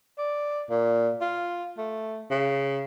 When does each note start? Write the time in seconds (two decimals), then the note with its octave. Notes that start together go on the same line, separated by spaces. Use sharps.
0.18 D5
0.70 A#2
1.21 F4
1.78 A3
2.30 C#3